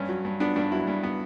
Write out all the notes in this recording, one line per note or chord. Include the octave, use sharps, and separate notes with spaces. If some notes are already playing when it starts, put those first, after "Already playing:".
Already playing: G2 C#4
F#3
G2
B3 D4
G2 D4
F#3 E4
G2
B3